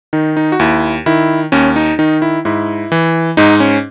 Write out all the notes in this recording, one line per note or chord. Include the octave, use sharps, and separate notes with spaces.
D#3 D#4
D#4
F#4
D#2 E4
D#3 E4
D#2 C#4
D#4
D#3 D#4
E4
G#2 E4
E3
G#2 D#4
C#4